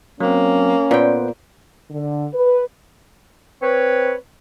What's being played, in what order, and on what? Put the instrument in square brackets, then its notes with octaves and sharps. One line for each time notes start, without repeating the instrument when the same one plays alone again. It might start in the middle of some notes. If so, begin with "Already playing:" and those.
[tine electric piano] F#3 C4 [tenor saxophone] A#3 [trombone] C#4
[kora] A#2 G5 [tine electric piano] B3 B4 C5
[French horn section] D3
B4
[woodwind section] C4 B4 C#5